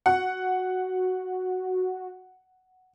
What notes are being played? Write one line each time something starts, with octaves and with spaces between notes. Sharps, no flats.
F#4 F#5